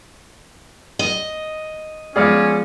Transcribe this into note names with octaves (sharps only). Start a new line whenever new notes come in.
D#5
F3 G#3 B3 C#4 G#4 D5 F6